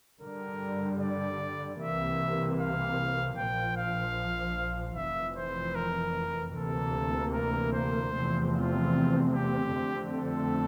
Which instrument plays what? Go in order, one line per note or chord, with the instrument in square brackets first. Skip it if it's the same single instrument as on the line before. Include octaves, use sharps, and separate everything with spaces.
[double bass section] G2 D3 G3 [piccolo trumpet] A#4
[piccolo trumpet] D5
[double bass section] C2 C3 E3 A#3 [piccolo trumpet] E5
[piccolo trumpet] F5
[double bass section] A#1 A#2 F3 [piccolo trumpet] G5
[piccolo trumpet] F5
[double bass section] F1 F2 E3 [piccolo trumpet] E5
[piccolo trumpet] C5
A#4
[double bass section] D2 C3 E3 A#3 [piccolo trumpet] A4
[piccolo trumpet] A#4
C5
[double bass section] E2 C3 F3 A3 C4
[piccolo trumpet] F4
G4
[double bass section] F2 D3 A3 C4
[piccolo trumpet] A4